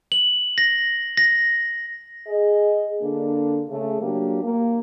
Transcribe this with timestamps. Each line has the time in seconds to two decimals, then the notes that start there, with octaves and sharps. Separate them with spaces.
0.12 F#7
0.58 A#6
1.17 A#6
2.28 G#4 D#5
3.02 D3 A#3 D4
3.69 C#3 A3
4.01 F#3 A#3 D4 G4
4.43 A#3